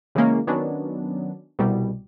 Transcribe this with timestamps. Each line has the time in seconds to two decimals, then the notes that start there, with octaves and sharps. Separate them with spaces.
0.15 C#3 E3 G#3 A#3 C#4
0.47 D#3 F#3 B3 C#4 D4
1.59 C2 B2 G3